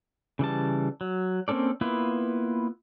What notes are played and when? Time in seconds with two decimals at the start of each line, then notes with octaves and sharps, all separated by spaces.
0.39 C#3 E3 G3 A5
1.01 F#3
1.48 A#3 C4 C#4 A4 D5
1.81 A#3 B3 E4 F4 B4